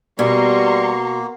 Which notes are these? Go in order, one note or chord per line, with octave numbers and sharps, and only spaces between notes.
B2 G3 A#3 A#5 C6 C#6